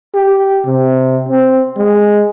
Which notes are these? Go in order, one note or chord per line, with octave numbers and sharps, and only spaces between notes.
G4
C3
C4
G#3